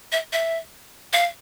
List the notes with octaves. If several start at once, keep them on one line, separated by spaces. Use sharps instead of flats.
E5
E5
F5